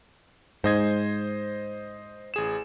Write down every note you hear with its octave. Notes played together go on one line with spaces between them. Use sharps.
G#2 C5 D#5 G#6
A1 G#4 E7